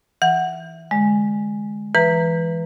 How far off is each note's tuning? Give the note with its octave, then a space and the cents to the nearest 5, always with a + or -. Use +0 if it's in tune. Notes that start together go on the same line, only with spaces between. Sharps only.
E3 +0 F#5 +0
D3 +10 G#3 +0
E3 +20 B4 +0 A#5 -10